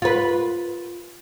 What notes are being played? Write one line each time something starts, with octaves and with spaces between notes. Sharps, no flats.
F4 B4